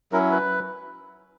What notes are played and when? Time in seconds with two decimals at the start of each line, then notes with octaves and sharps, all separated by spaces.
0.12 F#3 C#4 E4 A#4
0.31 B4